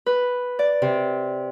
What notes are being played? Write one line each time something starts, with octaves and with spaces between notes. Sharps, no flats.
B4
D5
C3